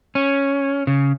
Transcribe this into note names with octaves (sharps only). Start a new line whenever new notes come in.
C#4
C#3